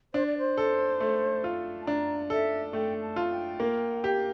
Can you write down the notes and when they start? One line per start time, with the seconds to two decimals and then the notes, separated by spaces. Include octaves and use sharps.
0.14 D4 C5
0.26 D5
0.38 C5
0.57 A4
1.00 A3
1.44 F4
1.82 A5
1.87 D4 A#5
2.30 A4 E5
2.73 A3 G5
3.02 A5
3.16 F4
3.31 G5
3.60 A#3
4.04 G4